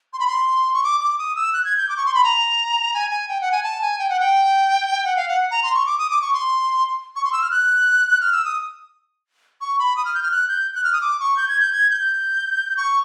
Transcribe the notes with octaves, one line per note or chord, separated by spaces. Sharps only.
C6
B5
C6
C#6
D6
D6
D#6
E6
F#6
G#6
G6
D6
C#6
C6
B5
A#5
G#5
G#5
G5
F#5
G#5
A5
G#5
G5
F#5
G5
F#5
F5
F#5
A#5
C6
C#6
D6
D#6
D6
C#6
C6
C#6
C6
E6
F6
F#6
F6
E6
D#6
C#6
B5
D#6
F6
G6
F6
F#6
G6
F#6
F6
D#6
D6
C#6
G6
G#6
G6
G#6
G6
C#6